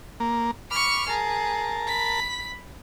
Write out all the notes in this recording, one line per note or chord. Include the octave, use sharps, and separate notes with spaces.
A#3
B5 C#6 D6 F6
G#4 A#4 A5
B5 B6